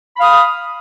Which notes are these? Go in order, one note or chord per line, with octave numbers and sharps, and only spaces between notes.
F5 B5 D#6